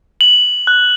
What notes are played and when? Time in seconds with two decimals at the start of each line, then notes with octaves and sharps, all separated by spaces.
0.21 F#7
0.67 F#6